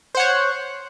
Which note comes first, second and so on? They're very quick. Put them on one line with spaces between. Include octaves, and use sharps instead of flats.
C5 F#5 C#5